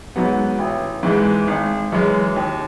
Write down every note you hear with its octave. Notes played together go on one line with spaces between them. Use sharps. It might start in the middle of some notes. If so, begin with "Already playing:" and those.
G#2 F#3 B3
A1
G#2 E3 G#3
G#1
F#2 E3 G#3
D#2